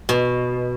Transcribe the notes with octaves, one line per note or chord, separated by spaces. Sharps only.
B2